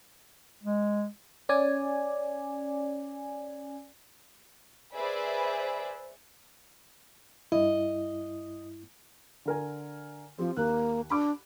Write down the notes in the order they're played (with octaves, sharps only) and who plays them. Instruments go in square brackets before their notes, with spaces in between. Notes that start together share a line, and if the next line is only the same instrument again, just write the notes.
[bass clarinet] G#3
[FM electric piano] C#4 D5 G#5
[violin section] G#4 B4 C5 D5 E5 B5
[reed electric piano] G2 E4 [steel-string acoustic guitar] D#5
[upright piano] D3 A#4 G#5
[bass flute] F3 [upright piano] C4 G4
[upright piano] D#2 F#6 [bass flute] A#3
[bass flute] D4 [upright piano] B5 D6